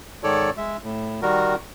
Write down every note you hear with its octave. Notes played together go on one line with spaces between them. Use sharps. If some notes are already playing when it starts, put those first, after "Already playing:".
G#2 D#3 A4 C#5 D5
G#3 E5
A2
D#3 G3 F#4 A#4